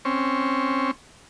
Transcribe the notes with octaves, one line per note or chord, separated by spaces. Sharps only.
C4 C#4